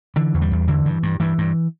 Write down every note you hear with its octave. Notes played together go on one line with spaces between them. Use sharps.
D3 E3
E2
G3
E2
D3 E3
G2
G2
G2 E3
G2